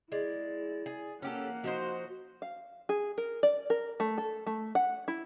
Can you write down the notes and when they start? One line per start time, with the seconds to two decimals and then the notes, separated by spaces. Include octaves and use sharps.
0.12 G#3 E4 D5
0.86 G#4
1.22 A#3 C#4 G4 A4 F#5
1.64 F3 D#4 F#4 C5
2.42 F5
2.89 G#4
3.18 A#4
3.43 D5
3.70 A#4
4.00 A3
4.18 A4
4.46 A3
4.75 F#5
5.08 E4